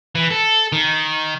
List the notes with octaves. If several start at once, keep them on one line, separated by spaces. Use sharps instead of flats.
E3
A4
D#3